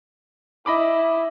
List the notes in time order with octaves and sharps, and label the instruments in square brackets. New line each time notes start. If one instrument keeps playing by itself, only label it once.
[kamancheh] E4 [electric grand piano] D#5 B5 D6